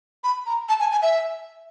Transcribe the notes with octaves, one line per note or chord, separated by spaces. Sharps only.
B5
A#5
A5
G#5
G#5
E5